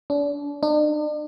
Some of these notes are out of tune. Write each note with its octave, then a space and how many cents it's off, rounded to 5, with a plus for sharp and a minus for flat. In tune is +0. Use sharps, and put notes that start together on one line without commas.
D4 -35
D4 +45